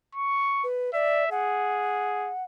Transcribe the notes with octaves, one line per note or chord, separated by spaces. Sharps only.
C#6
B4
D5 E5
G#4 F#5